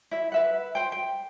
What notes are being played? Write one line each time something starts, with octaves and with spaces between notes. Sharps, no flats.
E4 E5
B4 E5 F#5
C5 G5
G5